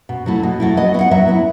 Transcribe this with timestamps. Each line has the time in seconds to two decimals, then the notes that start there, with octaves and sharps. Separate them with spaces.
0.09 B2
0.26 F#3 A3 E4
0.43 B2
0.60 F#3 A3 E4
0.77 F#3 D#5
0.94 B3 E4
1.01 F#5
1.11 F#3 E5
1.28 B3 E4